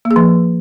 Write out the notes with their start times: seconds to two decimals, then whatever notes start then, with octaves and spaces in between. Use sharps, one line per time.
0.05 A#3
0.11 G#4
0.16 F3